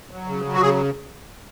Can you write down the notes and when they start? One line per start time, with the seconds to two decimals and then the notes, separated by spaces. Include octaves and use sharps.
0.11 F#3
0.28 C#3
0.45 F#3
0.54 F#4
0.60 C#3 G#4